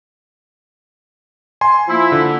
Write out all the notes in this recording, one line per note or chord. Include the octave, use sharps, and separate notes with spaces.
G#5 C6
F3 A#3 E4
D3